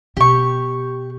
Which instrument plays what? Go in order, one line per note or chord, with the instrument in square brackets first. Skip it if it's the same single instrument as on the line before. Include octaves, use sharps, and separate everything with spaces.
[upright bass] B2 [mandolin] G4 C#6